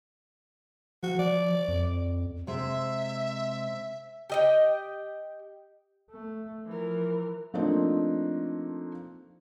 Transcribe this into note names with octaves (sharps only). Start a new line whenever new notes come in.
F3 F#4
F3 D5
F2
C3 G#3 C4 E5
G4 D#5 G5
A3
E3 F3 A#4
F3 A3 A#3 C4 D4 D#4